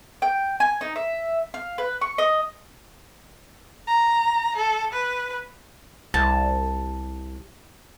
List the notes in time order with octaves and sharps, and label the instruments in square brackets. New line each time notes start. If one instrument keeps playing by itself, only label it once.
[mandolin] G5
G#5
D#4
E5
F5
B4
C#6
D#5
[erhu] A#5
A4
B4
[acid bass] C2 [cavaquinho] A5